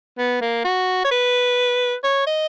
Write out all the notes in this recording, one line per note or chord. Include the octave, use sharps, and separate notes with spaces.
B3
A#3
F#4
C#5
B4
C#5
D#5